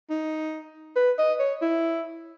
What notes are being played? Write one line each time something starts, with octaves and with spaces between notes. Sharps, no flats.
D#4
B4
D#5
C#5
E4